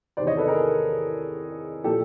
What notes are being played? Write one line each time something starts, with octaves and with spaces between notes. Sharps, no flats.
E2 C3 D#3 C5 D5
C#5 D#5
A4 B4
G#4 A#4
A#2 F3 G4 A4